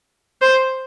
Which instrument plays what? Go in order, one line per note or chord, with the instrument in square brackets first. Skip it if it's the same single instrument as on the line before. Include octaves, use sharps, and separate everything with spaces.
[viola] C5